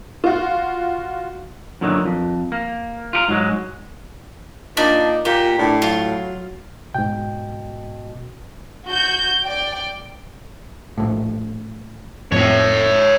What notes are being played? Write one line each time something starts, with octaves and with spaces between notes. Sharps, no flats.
F4 F#4
F#2 A#2 D3 D#3 F#3
F2
A#3
F4 G4 A#4
G#2 F#3 G#3
A#2 D4 D#4
A#2 A#3 G4
A2 D4
F#3 F4
G#2 B2 G5
F#4 G6
D5 G5
A#1 A2
F2 A2 C4 C#5 E5